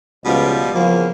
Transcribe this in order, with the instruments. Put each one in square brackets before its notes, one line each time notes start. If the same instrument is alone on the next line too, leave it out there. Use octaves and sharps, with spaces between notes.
[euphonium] C#2 [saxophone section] B2 F3 G3
[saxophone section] E2 C#3 A#3 [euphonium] F3